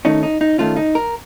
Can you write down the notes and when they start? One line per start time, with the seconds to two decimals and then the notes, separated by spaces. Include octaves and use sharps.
0.05 D#3 A3 C#4 D#4
0.23 D#4
0.41 D#4
0.58 D#3 A3 C#4 F4
0.77 D#4
0.95 A#4